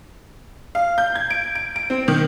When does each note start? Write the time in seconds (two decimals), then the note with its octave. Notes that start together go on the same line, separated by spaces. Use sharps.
0.75 F5
0.98 G6
1.16 G#6
1.30 D7
1.55 D7
1.76 D7
1.90 C4
2.08 D#3